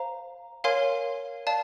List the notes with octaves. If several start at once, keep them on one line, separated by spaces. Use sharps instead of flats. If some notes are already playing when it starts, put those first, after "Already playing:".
Already playing: C5 F5 A#5
A#4 C#5 F5 G#5 C6
D5 F5 A5